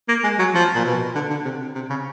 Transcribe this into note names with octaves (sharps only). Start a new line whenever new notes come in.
A#3
G#3
F#3
F3
A#2
B2
D3
D3
C3
C3
C#3